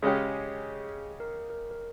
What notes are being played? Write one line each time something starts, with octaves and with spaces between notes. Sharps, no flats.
C#3 G#3 C#4 G4 G#4
A#4
A#4
A#4